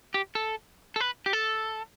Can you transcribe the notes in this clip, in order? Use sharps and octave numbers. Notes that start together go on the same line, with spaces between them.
G4
A4
A4
B4
G4
A4